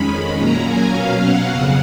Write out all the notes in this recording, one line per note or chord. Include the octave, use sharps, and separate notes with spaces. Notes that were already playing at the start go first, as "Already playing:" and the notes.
Already playing: F2 D#3 G#3 C#4 B5
A#2 F#3 A#3 C#4 A#5
G#5
B2 F#3 C#4 F5
F#5
F2 C#3 F#3